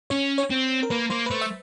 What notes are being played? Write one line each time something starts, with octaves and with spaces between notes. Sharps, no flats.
C#4 C#5
C#5
C4
A#4
A#3 B4
A#3 C5
B4
A3 C5
E5